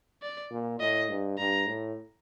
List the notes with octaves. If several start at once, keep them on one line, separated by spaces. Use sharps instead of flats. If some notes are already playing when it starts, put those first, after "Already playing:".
D5
A#2
A2 D#5
G2
G2 A#5
A2